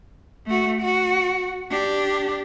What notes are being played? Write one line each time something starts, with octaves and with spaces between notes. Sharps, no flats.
A3 F#4
F#4
D4 G4